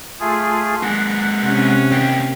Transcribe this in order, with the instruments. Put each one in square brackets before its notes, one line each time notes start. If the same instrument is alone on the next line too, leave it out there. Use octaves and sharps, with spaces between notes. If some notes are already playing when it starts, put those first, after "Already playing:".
[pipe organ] A3 F4 G#4
[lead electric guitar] G#3 A#3 [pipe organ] F#5
[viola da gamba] C3 C#4
[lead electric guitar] A#3 G4